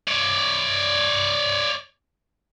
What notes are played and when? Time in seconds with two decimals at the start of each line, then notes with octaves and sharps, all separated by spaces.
0.07 C#5 D5